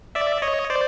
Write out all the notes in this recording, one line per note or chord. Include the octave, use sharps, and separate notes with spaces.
D5 E5
C#5 D#5
C5 D5